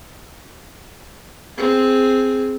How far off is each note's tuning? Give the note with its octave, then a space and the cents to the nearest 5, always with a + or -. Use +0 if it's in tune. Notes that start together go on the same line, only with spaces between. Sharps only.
C4 -5 G#4 +0